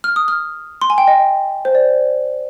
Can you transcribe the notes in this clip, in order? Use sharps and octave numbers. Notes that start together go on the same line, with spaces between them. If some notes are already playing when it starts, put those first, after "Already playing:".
F6
D#6
F6
C6
G#5
G5
D#5
C5
D5